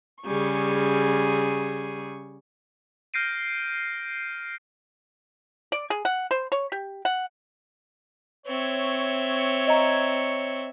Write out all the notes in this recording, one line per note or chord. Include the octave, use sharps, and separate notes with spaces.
C#3 G3 G#4 C#6
F6 G6 A#6 C7 D7 D#7
D5
G#4
F#5
C5
C#5
G4
F#5
C4 C#5 E5
D#5 A#5